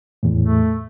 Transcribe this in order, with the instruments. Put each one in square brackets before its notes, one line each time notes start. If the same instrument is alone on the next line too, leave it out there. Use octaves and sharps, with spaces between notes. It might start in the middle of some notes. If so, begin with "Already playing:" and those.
[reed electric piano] E2 A2
[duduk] A3